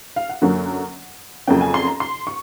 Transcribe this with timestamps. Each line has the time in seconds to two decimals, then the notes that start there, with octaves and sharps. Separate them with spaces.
0.16 F5
0.29 F#5
0.42 F#2 D3 F#3 A#3 C#4
1.47 F2 C#3 F#3 A#3 C#4 G5
1.61 G#5
1.74 C6
1.87 A#5
2.00 C6
2.27 C#6